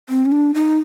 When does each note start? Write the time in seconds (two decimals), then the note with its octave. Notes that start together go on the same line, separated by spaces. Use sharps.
0.09 C4
0.26 C#4
0.32 D4
0.54 D#4